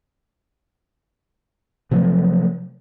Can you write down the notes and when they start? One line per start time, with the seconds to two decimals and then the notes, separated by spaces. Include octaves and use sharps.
1.91 C3 F3 F#3 A3